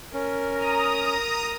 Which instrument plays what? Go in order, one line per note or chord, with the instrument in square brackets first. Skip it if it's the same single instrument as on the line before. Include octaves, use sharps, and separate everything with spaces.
[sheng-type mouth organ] C#4 [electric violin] A#4
[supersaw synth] A#5 D#6